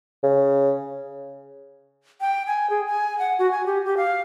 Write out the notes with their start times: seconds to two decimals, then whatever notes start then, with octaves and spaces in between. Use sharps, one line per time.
0.24 C#3
2.21 G5
2.47 G#5
2.70 G#4
2.87 G#5
3.19 F#5
3.39 F#4
3.51 G#5
3.66 G4
3.85 G4
3.97 F5